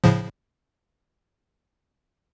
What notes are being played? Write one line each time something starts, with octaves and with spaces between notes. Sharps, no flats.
A2 C#3 F3